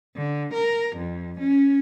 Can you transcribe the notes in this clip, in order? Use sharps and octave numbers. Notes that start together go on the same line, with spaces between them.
D3
A#4
F2
C#4